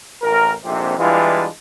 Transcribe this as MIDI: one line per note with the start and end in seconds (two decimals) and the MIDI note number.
0.22 0.52 33
0.22 0.52 70
0.64 0.94 34
0.64 0.94 41
0.64 0.94 44
0.64 0.94 48
0.99 1.47 52
0.99 1.47 55
0.99 1.47 56
0.99 1.47 62
0.99 1.47 64
0.99 1.47 65